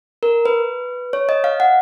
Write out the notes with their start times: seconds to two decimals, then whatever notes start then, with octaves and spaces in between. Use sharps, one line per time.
0.23 A#4
0.46 B4
1.13 C#5
1.29 D#5
1.44 F5
1.60 F#5